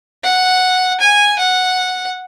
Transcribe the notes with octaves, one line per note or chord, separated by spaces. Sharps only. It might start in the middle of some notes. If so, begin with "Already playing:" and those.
F#5
G#5
F#5